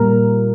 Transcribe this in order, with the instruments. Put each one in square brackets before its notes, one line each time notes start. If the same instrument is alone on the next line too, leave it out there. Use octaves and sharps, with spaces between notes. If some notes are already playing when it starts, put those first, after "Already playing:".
Already playing: [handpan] A#2 G3 A#3 A#4